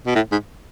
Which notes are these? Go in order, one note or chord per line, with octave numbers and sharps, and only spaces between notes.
B2
A2
G#2